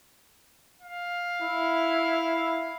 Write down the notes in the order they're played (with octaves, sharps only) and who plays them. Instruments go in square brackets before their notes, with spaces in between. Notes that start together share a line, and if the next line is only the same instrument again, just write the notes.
[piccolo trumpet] F5
[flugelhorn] E4